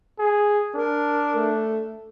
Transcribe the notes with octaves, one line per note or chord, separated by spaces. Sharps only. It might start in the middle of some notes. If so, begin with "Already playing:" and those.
G#4
D4 A#4
A3